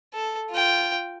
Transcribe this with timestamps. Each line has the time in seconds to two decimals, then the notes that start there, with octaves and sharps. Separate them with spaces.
0.14 A4
0.51 F4 G5